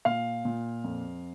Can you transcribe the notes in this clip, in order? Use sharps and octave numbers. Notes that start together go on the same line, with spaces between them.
A#2 F5
A#2
F2